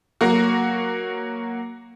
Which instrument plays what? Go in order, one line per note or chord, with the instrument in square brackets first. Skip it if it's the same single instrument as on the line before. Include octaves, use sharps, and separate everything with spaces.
[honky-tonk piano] F#3 A#3 F#4